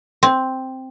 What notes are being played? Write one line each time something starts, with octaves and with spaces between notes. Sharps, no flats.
C4